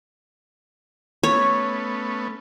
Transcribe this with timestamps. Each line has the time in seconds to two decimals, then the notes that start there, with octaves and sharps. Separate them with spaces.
1.23 A3 B3 C#4 C#5